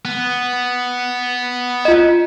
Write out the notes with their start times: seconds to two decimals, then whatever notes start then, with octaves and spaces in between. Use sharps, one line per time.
0.05 B3
1.85 F4 D#5